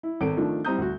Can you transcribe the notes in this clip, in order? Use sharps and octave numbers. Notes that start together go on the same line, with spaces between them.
E4
G#1 A4 D7
D#3 F3 A3 D4
G3 C4 E4 A#5 D#6 G6
D2 F#4